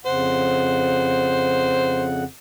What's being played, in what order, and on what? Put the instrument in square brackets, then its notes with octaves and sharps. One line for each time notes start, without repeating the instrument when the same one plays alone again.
[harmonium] F2 C#3 F#5 [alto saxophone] C5